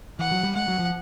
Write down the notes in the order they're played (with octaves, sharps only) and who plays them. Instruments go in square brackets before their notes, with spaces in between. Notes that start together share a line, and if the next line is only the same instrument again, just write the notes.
[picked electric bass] E3 [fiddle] F#5
[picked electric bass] F#3
G3
[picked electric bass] G#3 [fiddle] F#5
[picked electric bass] F#3
F3